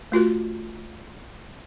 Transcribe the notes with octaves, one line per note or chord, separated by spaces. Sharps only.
A3 F4 F#4 A#4